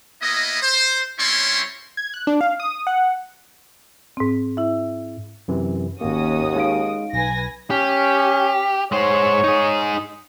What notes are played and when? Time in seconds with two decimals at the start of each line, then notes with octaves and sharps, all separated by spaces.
0.22 A#3 B3 E4 D#5
0.62 C5
1.19 G3 C4 C#4 E4 C#5 C6
1.97 G#6
2.14 F#6
2.27 D4
2.41 F5
2.60 D#6
2.87 F#5
4.17 G#2 C4
4.57 E4 E5
5.48 F#2 C3 E3
6.01 G#1 D#2 A#3 C#4 F#4 D#6
6.56 G#3 D#4 F5 D7
7.13 B1 B4 G#5 A#6
7.70 C#4 G4
8.92 G#3 C5 C#5
9.44 D#4 G#4